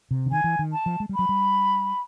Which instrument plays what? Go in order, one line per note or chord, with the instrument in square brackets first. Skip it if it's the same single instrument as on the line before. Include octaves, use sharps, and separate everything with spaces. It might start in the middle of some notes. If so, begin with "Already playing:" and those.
[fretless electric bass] C3
D3
[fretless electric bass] D#3 [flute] G#5
[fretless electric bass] E3
D#3
[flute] A5
[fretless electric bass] F3
G#3
G3
[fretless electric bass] F#3 [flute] B5
[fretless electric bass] G3